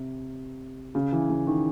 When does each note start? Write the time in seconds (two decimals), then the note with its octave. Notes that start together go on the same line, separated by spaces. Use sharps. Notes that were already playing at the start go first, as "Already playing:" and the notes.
Already playing: C3
0.95 C#3
1.12 E3
1.30 C#3
1.47 D#3